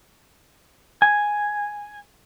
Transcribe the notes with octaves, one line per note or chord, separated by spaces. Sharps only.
G#5